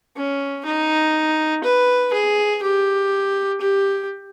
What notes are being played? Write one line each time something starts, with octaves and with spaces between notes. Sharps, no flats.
C#4
D#4
B4
G#4
G4
G4